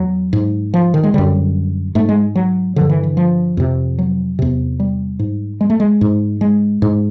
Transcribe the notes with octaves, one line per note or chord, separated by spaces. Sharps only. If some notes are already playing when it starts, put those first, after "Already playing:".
Already playing: E2 F#3
G#2
F3
D#3
G#3
F#2 D3 G3
G#2 A3
G#3
F#3
G2 D3 F3
E3
E3
F3
F2 C3
F#3
E2 C3
G3
G#2
G#3
A3
G#3
G#2
G#3
G#2